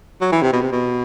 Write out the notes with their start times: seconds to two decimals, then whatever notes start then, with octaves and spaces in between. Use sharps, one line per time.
0.21 F#3
0.32 E3
0.42 C3
0.52 B2
0.62 C3
0.72 B2